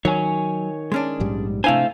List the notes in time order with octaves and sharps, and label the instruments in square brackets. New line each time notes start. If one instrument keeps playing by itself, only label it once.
[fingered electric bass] D#3 [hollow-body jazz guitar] F#3 [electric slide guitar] C#5 G#5
[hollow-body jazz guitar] G#3 C#4 D4
[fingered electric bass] A#1 G#2 G3
[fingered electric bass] C3 D4 [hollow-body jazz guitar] A3 E4 G#5 [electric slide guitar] C5 F5